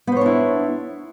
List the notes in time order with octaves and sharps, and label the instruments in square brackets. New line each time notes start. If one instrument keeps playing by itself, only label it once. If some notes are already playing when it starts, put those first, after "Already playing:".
[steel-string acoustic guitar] B3
C5
C#5
D4
E4